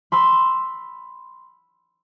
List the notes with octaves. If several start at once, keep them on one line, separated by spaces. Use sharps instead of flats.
B5 C6 E6